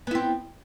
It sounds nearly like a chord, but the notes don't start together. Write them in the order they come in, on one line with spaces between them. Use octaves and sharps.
B3 E4 C4